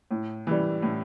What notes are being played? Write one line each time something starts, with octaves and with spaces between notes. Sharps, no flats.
A2
E3 G3
A2